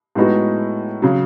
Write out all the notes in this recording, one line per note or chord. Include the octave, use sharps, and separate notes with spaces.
A2 G#3 B3 D#4 F#4
C#3 F#3